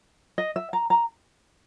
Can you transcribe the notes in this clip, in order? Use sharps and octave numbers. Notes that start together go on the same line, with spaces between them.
D#5
E5
A#5
A#5